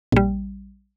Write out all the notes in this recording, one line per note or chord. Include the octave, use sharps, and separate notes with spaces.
A#1 G3